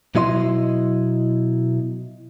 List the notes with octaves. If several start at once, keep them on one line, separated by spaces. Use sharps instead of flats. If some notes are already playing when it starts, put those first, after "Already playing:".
B2 F#3 E4 D#5 C6